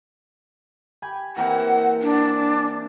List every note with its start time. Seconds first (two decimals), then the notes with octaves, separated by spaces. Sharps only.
1.02 G4 G#5 B5
1.37 E3 A#3 C4 F#5
2.02 D4